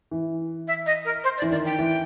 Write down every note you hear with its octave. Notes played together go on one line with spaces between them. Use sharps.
E3
E5
D#5
A#4
C5
D5
E3
D#3 D5
G5
E3